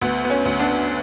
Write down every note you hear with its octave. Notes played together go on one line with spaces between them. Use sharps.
D2 B3
B3
C#4
D2
B3 D4